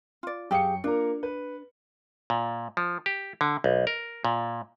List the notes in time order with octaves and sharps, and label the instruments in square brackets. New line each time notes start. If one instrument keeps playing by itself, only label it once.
[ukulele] F4 D5
[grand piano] F#2 G5 C#7 [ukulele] G4 G#4 F5
[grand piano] A#3 F4 A#4 [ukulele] D4
[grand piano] B4
[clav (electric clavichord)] A#2
F3
G4
D3
B1
A#4
A#2